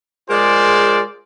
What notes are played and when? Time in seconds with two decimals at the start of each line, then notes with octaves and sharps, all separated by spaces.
0.30 G#3 F4 G#4 A#4 C5 D5